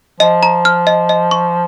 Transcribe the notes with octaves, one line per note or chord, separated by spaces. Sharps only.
F3 D#5
A#5
F6
D#5
D#5
C#6